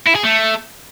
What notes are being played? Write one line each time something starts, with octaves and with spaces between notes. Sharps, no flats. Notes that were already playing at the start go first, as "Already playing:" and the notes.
E4
G#4
A3